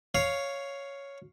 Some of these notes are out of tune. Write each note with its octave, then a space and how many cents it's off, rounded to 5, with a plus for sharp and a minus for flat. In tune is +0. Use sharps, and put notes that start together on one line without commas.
C#5 +5 F5 +0